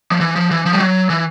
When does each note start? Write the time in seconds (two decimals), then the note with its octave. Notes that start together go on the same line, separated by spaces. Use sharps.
0.12 F3
0.20 E3
0.36 F3
0.51 E3
0.66 F3
0.73 G3
0.80 F#3
1.10 E3